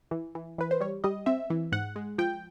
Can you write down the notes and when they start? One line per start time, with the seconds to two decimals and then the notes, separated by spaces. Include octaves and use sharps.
0.11 E3
0.35 E3
0.58 E3 B4
0.71 C5
0.81 G3 C#5
1.04 G3 D#5
1.26 C4 E5
1.50 E3
1.72 G#2 F#5
1.96 G#3
2.18 F3 G5